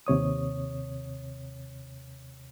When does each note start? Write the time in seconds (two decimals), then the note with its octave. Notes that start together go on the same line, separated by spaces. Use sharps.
0.07 D#2 C3 C#5 D#6